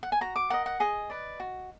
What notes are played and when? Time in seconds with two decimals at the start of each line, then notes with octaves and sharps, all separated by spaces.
0.03 F#5
0.12 G#5
0.21 F#4 A#5
0.36 D6
0.50 A#4 D#5 F#5
0.66 F#5
0.80 G#4 D#5
1.10 B4 D5
1.40 F#4